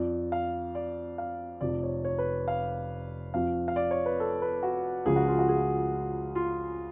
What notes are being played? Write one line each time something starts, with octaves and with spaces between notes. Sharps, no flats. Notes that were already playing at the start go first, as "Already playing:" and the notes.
Already playing: F2 F3 D5
F5
D5
F5
F1 F2 F3 D5
C#5
C#5
B4
F5
F2 F3 F5
F5
D5
C#5
B4
A4
B4
F#4
C#2 C#3 F3 G#4
F#4
F4
F#4
G#4
F4